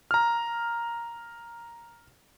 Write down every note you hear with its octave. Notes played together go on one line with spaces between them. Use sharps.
A#5 F6